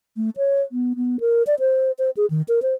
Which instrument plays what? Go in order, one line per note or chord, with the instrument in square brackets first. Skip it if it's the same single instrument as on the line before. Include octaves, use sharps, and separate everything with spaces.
[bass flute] A3
C#5
B3
B3
A#4
D5
C5
C5
G#4
D#3
A#4
C5